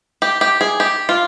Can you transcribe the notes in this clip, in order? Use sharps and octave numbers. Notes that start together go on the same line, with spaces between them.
G4
G4
G#4
G4
F4